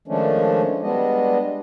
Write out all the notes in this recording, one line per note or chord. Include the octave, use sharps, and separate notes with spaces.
D#3 F3 G#3 A3 C#4 D4
G3 G#3 B3 D4 D#5